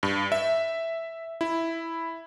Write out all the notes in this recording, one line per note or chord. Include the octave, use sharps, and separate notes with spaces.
G2
E5
E4